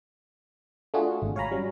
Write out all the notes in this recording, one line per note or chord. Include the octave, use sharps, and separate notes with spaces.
A3 D4 F4 F#4 G#4
G#1
C#5 F5 G#5 A#5 B5
F#3 G3 C#4